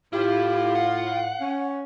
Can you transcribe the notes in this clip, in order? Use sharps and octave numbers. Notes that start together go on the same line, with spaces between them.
A2 E4 F4 G4
F5 F#5
C#4